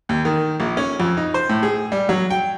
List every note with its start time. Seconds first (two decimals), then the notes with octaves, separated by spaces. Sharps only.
0.09 D#2
0.25 D#3
0.60 A#1
0.77 C#4
1.00 F2
1.17 D#4
1.34 C5
1.49 A2
1.63 G#4
1.92 G3
2.09 F#3
2.30 G5